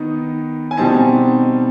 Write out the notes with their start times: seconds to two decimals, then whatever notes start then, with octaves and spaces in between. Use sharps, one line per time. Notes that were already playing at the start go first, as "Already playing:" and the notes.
Already playing: D#3 B3 D#4
0.71 G#5
0.77 B2 G3 C4 D#4 A5